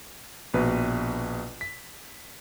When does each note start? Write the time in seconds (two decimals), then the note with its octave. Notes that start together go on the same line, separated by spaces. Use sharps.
0.54 A#1 B2 B4
1.61 B6